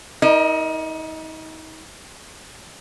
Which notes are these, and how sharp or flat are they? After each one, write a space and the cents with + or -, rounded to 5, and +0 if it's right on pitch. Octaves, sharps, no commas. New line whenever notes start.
D#4 +35 A#4 +0 D#5 -30